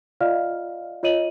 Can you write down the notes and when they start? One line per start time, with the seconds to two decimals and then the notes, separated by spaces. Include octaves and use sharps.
0.21 F4 D5 D#5 F5 F6
1.03 F4 C#5 D#5 D#7 F#7